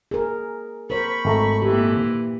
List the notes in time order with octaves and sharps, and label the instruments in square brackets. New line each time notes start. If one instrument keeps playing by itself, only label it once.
[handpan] G#4 A#4
[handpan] A#4 C5 [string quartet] B5 C#6
[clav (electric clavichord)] G#1 A3 A#5
[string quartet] A#2 E3 [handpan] G4